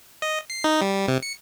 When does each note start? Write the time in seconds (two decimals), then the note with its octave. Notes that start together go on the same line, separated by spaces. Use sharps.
0.22 D#5
0.50 C7
0.64 D#4
0.81 G3
1.08 C3
1.23 C#7